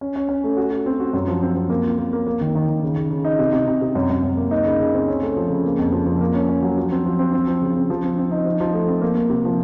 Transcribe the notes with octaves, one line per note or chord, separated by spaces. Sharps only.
C#4
C#4
C#4
A3
F#4
F#4
C4
F#4
F#2
F3
C4
C4
A#3
F4
A#3
A#3
A#3
D#3
D#3
D#3
C#3
C#3
C#3
D#4
C3
C3
C3
C3
F#2
F#2
F#2
A#3
D#4
C#3
C#3
C4
C#4
A3
F3
C#3
A#3
F2
F3
F3
A#3
C#4
C#4
F#3
F3
C4
F3
C4
C4
F3
C#3
C4
F3
C4
C4
D#4
F3
F3
A3
C4
A#3
A#3
C3
F3